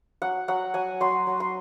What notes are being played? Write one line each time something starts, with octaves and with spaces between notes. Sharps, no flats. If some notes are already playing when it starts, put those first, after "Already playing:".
F#3 F#5
F#3 F#5
F#3 G#5
F#3 C6
F#3
C6